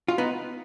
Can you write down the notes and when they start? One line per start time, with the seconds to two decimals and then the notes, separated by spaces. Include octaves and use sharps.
0.08 F4
0.18 B3 D#4